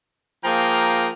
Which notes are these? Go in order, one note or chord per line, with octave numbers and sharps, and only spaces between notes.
F3 A#3 G#4 G5 A#5